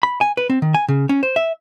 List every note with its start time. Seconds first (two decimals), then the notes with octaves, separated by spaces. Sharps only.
0.03 B5
0.21 G#5
0.37 B4
0.50 C4
0.62 D#3
0.74 G#5
0.88 C#3
1.09 C#4
1.23 C5
1.36 E5